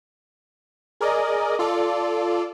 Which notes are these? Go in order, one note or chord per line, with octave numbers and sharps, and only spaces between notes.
G#4 A#4 D5 D#5
F4 A4 D5